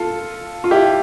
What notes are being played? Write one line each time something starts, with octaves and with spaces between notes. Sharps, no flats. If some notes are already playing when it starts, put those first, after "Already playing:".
Already playing: F4 A4
F4
E4 G4